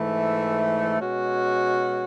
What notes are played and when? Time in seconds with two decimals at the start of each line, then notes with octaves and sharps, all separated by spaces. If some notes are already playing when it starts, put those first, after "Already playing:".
Already playing: G#2 E3 A3
0.99 B2 G#3 C#4 F#4